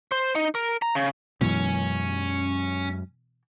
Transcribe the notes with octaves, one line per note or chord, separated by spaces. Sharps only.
C5
D#4
A#4
A#5
C#3
F#2 B2 E3 F#3 G#3 C#4